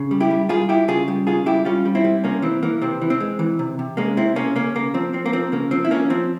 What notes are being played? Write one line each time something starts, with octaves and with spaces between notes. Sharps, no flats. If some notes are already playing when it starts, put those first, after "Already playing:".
Already playing: C#3
G3
E4 G4
G3
G3 F4 G#4
G3 E4 G4
C#3 F4 G#4
G3
C#3 F4 G#4
G3 E4 G4
G3 C#4 F4
G3
C4 E4
G3
C3 A#3 C#4
E3 C4
E3 A#3
C3 C4
E3
C4
G#3
E3
C3
C3
G#3 A#3 C#4
C3 C4 E4
C3 A#3 C#4
C#3 A#3 C#4
C#3 A#3
F3 C4
F3 C4
A#3
F3 C4
C#3 A#3
F3 C4
E4
F3 A#3 C#4
F3 C4